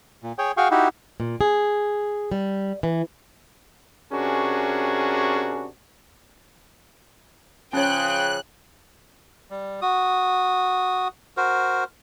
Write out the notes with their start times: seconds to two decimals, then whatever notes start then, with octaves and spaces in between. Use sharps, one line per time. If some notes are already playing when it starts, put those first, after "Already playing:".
0.23 A#2
0.38 G#4 C#5 G5
0.57 F#4 G#4 F5 G5 C#6
0.71 D#4 E4 F#4 G4
1.20 A#2
1.41 G#4
2.32 G3
2.83 E3
4.13 C3 C#4 D4 F#4 G#4 A#4
7.73 C#3 F3 C#4 C#5 G5 F#6
9.50 G3
9.82 F#4 D#6
11.37 F#4 A#4 C5